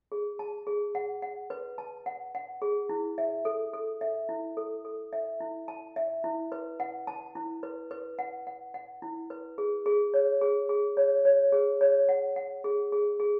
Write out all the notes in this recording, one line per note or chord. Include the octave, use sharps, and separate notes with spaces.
G#4
A5
G#4
F#5
F#5
B4
A5
F#5
F#5
G#4
E4
E5
A4
A4
E5
E4
A4
A4
E5
E4
A5
E5
E4
B4
F#5
A5
E4
B4
B4
F#5
F#5
F#5
E4
B4
G#4
G#4
C#5
G#4
G#4
C#5
C#5
G#4
C#5
F#5
F#5
G#4
G#4
G#4